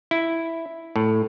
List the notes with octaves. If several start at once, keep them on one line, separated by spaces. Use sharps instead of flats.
E4
A2